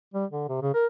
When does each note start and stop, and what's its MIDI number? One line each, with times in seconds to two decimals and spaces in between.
0.14 0.25 55
0.31 0.47 50
0.48 0.59 48
0.62 0.71 49
0.74 0.86 70